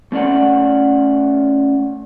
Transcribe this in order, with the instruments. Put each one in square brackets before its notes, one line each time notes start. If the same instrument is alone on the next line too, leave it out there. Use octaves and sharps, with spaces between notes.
[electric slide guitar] A3 C#4 D5 F#5